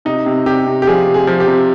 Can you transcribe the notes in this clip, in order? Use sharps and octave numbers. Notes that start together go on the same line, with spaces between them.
C3 D#4
C3
C3 G4
C3
G4
F3 G#4
C3
G#4
F3
G4
C3